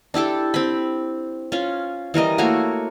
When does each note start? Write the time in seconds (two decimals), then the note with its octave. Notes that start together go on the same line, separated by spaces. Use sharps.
0.14 D4 E4 G4 A4
0.54 C4 B5
1.52 C#4 F4
2.14 E3 G3 A#4 D#5
2.38 A3 A#3 F#4 C#5